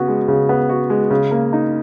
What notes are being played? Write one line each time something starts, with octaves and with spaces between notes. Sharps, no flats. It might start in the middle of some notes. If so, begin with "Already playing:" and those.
Already playing: C#3 B3 F#4
G#3
C#3
B3
F#4
G#3
C#3
A#3
D#4